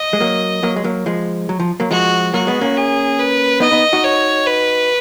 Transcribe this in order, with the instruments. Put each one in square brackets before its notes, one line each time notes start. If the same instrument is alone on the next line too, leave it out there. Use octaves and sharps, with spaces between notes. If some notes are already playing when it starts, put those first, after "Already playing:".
Already playing: [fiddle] D#5
[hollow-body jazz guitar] G#3
F#3 A#3
F#3 A#3
G#3
F#3 A#3
F3 G#3
F#3
F3
F#3 A#3
[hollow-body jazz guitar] F3 G#3 [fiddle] F#4
[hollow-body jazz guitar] F#3 A#3 [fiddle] F#4
[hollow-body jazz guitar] G#3 B3
A#3 C#4
[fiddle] G#4
B4
[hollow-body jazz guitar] B3 D#4 [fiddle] D#5
[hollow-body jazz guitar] B3 D#4
D#4 F#4
[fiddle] C#5
B4